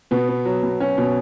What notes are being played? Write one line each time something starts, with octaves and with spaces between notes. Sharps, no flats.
B2 B3
B3
F#3
B2
F#3 C#4
B2